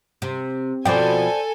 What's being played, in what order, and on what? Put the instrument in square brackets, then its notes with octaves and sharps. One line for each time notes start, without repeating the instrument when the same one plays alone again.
[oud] C3
[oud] B2 F3 [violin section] A4 G#5 [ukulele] C5 D5 G5